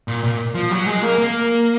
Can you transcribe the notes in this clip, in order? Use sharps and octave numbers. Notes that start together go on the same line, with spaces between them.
A#2
A#2
F3
F#3
G#3
A#3
A#3